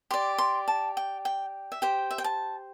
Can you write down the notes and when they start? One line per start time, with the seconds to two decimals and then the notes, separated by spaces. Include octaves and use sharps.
0.11 G4 D5 C6
0.38 C6
0.68 A5
0.97 G5
1.25 G5
1.72 E5
1.82 G4 C5 G5
2.11 E5
2.18 G5
2.24 A5